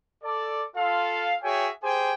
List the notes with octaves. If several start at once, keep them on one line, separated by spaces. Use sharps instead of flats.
A4 D5
F4 A4 F5
F#4 G#4 C#5 E5 G5 G#5
G4 G#4 C5 G5 G#5